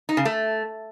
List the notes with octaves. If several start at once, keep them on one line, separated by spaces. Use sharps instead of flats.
D#4
C#3
A3